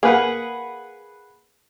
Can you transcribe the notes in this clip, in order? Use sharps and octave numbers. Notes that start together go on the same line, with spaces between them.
A#3 G#4 B4 F#5